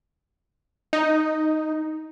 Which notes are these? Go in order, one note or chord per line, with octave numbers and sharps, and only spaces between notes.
D#4